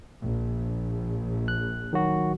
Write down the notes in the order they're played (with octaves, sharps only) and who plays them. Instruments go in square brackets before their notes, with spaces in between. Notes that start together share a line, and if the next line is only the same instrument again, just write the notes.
[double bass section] A#1
[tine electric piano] F#6
D#3 F#3 F#4